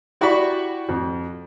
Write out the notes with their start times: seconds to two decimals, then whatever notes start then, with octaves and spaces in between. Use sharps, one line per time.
0.21 E4 F#4 G4 D5 B5 C#6
0.89 F2